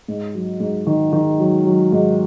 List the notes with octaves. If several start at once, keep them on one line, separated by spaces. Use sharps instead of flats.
G#2
F#3
G#2
D#3
D#3
F#3
F#3
G#2